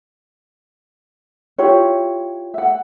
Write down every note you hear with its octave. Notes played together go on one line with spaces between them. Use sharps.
E4 F4 G4 C#5
E5 F#5